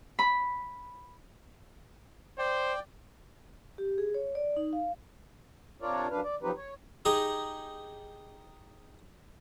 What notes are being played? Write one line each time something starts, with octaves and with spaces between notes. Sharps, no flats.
B5
C5 D5 G5
G4
G#4
C#5
D5
D#4
F5
C3 D4 F4 A#4 C#5 D5
F#2 D4 B4 F5
D5
F3 F#3 C4 D#4 G4 B4
C#5
D#4 G4 G#4 D#5 A#5